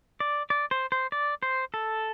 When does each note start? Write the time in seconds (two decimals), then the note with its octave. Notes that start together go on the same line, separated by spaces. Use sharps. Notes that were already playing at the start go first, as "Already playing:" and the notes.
0.20 D5
0.50 D5
0.71 C5
0.92 C5
1.12 D5
1.43 C5
1.74 A4